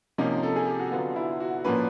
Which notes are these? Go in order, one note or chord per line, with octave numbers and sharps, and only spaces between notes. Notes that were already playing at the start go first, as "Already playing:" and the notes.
C3 F3 A#3 C#4 D#4
A4
G#4
G4
F#4
D3 F#3 B3 F4
E4
F#4
A#2 F3 A#3 C#4 B4